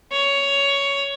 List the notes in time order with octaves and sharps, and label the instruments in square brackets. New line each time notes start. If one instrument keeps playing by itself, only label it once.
[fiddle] C#5